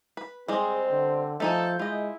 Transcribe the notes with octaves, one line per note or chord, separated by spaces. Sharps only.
B4
G3 G#3 C4 G#4 C5 D#5
D3
F3 A3 D#4 A4 G#5 G6
G#3 E4 F4 D#5